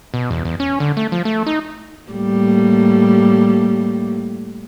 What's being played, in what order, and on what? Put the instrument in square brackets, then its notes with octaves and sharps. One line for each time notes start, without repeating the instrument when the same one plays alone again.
[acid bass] B2
E2
E2
C#4
D3
A3
F3
A3
D#4
[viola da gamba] A2 G3 A#3